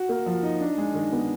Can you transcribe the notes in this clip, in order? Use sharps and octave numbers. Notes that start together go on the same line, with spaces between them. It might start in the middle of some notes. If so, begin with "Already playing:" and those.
Already playing: F#4
A#3
F3
D#4
D4
G#3
D#3
B3